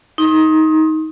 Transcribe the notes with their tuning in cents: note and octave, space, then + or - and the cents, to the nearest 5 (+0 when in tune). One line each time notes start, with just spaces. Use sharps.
D#4 +15 C6 +35